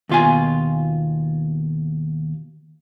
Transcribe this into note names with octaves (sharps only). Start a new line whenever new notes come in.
D#2 B2 F4 F5 G#5